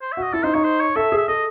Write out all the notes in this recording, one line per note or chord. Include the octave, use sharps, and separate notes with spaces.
C5
F#4 E5
D#5
E4 A4
D#4 C5
D#4 C#5
C5
C#5
A4 E5
G#4
E5
A4 D#5